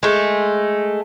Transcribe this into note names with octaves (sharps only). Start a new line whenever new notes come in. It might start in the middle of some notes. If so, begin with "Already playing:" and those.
G#3 A3